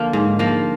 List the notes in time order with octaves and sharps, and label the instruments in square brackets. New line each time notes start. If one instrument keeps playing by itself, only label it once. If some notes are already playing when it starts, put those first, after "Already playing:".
Already playing: [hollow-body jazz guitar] D3 [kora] F3 A#3
[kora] G#2
F3 A#3